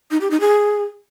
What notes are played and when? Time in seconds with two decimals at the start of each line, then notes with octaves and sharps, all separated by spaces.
0.11 D#4
0.21 G4
0.31 D#4
0.40 G#4